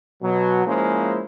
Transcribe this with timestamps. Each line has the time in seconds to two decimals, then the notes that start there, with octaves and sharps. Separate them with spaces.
0.22 B2 F#3
0.66 F3 G#3 A#3 C#4 E4 C5